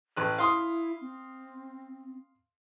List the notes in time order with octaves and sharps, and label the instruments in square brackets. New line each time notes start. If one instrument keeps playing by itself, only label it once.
[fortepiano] A1 B4 F#6
[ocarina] E4 [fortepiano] F5 C6 D#6
[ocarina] C4